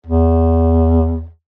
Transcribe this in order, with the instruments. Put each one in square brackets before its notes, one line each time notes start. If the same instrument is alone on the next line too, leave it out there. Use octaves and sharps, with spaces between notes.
[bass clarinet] E2